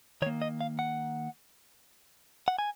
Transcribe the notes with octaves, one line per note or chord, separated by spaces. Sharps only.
D#3 A#3 C#5
D#5
F5
F#5
F#5
G#5